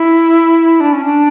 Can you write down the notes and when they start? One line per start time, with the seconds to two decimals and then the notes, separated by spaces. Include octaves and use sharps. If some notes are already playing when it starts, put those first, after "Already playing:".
Already playing: E4
0.80 D4
0.93 C#4
1.04 D4